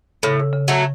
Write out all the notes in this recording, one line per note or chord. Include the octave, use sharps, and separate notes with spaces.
A2 C#3
C#3
F#3 A3